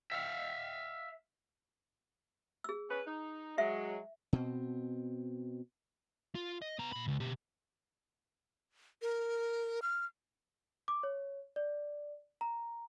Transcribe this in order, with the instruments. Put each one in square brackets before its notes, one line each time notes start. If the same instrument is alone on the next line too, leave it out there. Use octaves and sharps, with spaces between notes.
[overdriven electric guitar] E5 F5
[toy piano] G#4 E6
[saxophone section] C#4 B4
D#4
[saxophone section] F#3 G#3 [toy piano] E5
[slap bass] B2 C4
[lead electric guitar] F4
D#5
B3 A#5
A#2 B5
C#2
B2 G4
[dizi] A#4
F6
[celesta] D6
C#5
D5
A#5